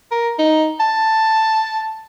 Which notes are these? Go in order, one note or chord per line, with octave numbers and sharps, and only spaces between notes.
A#4
D#4
A5